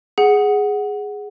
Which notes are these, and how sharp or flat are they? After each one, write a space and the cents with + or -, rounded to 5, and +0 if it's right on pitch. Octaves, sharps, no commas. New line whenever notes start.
G#4 +0 F#5 +0